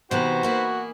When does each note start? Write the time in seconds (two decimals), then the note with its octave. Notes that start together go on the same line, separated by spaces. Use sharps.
0.11 C3 E3 B3 D#4 F#4 B4 C5
0.43 A#3 E4 G#4